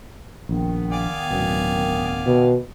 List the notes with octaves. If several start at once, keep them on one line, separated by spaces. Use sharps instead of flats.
A#1 D#3 B3
D5 F5 G#5
D1 F#2 B2
B2